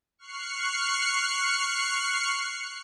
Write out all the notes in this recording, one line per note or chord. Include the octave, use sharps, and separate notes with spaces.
C#6 F6 F#6 C7 C#7